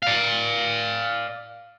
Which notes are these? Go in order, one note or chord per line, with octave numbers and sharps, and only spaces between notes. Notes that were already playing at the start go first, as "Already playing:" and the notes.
D5 F5